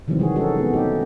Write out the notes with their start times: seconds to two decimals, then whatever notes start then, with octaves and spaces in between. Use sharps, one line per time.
0.08 C3 D#3 E3 F#3 G3 C4
0.19 D#3 G3 G#3 F#4 G#4
0.35 G#3 C#4 D#4 F#4 G#4 A4
0.57 G#3 B3
0.73 A3 C4 D#4 G4